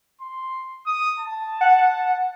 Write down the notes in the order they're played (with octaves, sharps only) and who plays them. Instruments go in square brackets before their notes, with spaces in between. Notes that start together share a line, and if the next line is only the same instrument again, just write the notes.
[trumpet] C6
D#6
A5
[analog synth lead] F#5